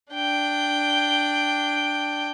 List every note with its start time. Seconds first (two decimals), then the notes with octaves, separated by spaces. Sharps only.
0.12 D4 G5